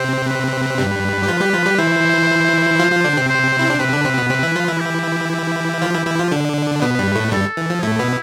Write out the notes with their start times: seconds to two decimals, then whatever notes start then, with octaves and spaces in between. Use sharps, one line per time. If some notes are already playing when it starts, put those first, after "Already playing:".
Already playing: C3 C4 C5
0.27 B4
0.78 G2 G3
1.23 G4
1.28 F3 F4
1.41 G3 G4
1.54 F3 F4
1.66 G3 G4
1.78 E3 E4 C5
2.79 F3 F4
2.92 F3 F4
3.05 D3 D4
3.17 C3 C4
3.29 C5
3.59 E4
3.70 D4
3.80 C3 C4 B4
3.92 D3 D4
4.05 C3 C4
4.18 B2 B3
4.30 C3 C4
4.43 E3 E4
4.55 F3 F4
4.68 E3 E4
4.80 G4
5.31 G4
5.82 F3 F4
5.94 E3 E4
6.06 E3 E4
6.19 F3 F4
6.32 D3 D4
6.82 B2 B3 B4
6.99 G2 G3
7.15 A2 A3
7.32 G2 G3 A4
7.57 E3
7.70 F3
7.82 A2 A3 E4
7.99 B2 B3